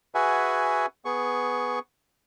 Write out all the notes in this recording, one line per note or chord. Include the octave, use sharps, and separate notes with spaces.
F#4 G#4 B4 E5 F#5 G#5
B3 G#4 C#6